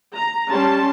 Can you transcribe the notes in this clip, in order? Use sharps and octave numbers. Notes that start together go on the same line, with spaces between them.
A#5
G3 C#4 A5 C6